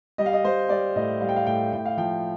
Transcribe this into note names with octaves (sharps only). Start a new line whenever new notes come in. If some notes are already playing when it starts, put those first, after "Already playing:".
G3 D#5
F5
D#5
G3 C5
G3 D5
A2 D#5
G3 F5
G5
F5
A2 G5
A2 G5
F5
F3 G5